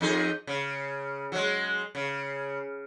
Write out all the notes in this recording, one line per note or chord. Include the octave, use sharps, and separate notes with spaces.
F2 D#4 G#4
C#3
F#3 G#3
C#3